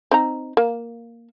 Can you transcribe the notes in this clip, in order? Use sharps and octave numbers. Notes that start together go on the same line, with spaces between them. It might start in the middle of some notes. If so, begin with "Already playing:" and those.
C4 D#4 A#5
A#3